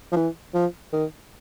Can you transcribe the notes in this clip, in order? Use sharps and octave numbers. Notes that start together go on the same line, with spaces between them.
F3
E3
F3
D#3